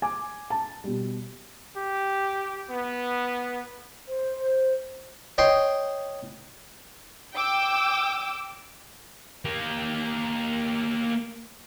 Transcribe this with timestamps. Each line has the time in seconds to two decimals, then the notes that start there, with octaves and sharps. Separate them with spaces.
0.02 G#5 D6
0.50 A5
0.84 B2 G3
1.77 G4
2.70 B3
4.07 C5
5.38 C#5 D#5 G5 C6
7.34 G5 D6 E6
9.45 A#3 G4